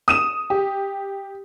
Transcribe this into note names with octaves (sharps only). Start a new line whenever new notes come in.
D#6 D#7 E7
G4